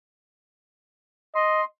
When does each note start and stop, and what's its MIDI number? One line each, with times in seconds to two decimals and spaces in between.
1.35 1.62 75
1.35 1.65 84